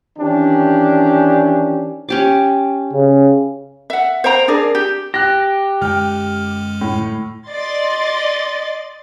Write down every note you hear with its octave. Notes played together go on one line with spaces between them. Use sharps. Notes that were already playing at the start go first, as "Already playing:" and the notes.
D#3 E3 C#4 D4 G4
C#4 G4 D6
C#3
E5 F#5
C5 F5 G5 A#5
D4 G#4 A#4 D5
G4
G4 F#6 A#6
F#2 D3 G#3 G5 F6
A2
D5 D#5 C6 A6